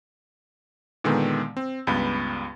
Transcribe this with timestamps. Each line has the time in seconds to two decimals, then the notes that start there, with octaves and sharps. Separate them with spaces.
1.04 A#2 D3 D#3 G#3 B3
1.57 C4
1.87 C#2 G2 B3 B5